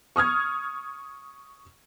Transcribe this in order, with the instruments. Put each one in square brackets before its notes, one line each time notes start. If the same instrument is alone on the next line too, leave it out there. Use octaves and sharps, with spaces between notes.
[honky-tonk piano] C#6 D#6 F6 G#6